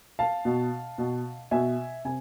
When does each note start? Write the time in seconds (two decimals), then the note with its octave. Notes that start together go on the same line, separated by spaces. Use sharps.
0.19 F5 A5
0.45 B2
0.98 B2
1.51 B2 E5 G#5
2.05 C3 G#5